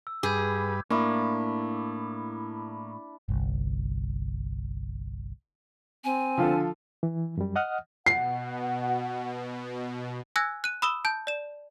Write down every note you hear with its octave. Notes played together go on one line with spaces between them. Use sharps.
E6
G2 G#4 B4 D6 G6 G#6
A2 A#3 D4 E4
G1 C2
C4 G#5
D3 F3 F4 A4
E3
F#2 G3
D#5 F#5 D#6 F6
B2 F#5 C7
G#5 E6 F#6 G#6 A#6
F#6 D#7
B5 D#6 E6 E7 G7
A5 G6
D5 E7